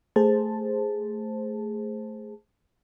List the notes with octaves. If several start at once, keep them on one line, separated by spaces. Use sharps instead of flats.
A3 G#4 C5 A5